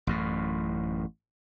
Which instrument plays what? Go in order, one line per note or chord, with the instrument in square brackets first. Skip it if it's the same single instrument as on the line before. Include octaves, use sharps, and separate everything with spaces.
[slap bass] A1 F#2 A2